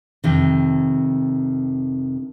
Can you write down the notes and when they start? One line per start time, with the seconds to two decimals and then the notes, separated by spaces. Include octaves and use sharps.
0.24 F2 C3 D#3